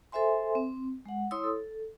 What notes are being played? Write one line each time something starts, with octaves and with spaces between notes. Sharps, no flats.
A4 C5 E5 G#5 C6
C4
G#3 F#5
E4 C#5 C6 D#6 E6
A4